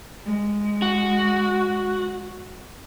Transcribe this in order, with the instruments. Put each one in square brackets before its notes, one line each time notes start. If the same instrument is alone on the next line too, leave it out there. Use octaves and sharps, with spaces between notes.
[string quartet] G#3
[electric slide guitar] F#4